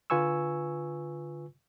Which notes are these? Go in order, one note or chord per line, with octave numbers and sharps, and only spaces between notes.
D3 F4 B4 G#5 C#6 E6